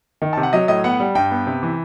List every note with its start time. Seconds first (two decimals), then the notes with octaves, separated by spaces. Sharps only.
0.22 D#3
0.33 A5
0.37 C3
0.43 F#5
0.53 F#3 D#5
0.68 A2 D#5
0.84 B3 F#5
1.00 G3
1.15 G2 G5
1.31 B3
1.47 C3
1.63 E3